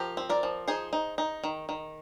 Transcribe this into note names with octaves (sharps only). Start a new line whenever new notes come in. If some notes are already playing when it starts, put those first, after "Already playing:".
Already playing: F3 G4 A#4
C4
A#4 D5
F3
D#4 G#4 C5
D#4
D#4
D#3
D#3